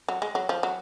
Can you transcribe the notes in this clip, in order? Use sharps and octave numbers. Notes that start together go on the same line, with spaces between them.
F#3
G#3
F#3
F3
F#3